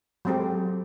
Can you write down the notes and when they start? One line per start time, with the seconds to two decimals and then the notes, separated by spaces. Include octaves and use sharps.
0.25 F#3 G#3 C4 G4 A4